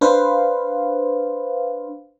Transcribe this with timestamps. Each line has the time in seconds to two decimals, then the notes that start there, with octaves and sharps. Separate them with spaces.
0.01 D4 B4 C5 F5